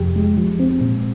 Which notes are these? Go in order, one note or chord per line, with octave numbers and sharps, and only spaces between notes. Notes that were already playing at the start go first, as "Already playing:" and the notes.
Already playing: F2 C3 F3 G4
G#3
F3
C4
A#2